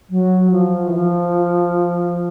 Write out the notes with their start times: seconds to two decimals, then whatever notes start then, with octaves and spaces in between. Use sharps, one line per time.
0.10 F#3
0.51 F3
0.88 E3
0.94 F3